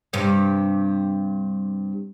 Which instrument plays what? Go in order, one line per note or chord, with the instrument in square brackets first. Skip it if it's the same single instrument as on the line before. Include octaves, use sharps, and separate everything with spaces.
[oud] G2 C3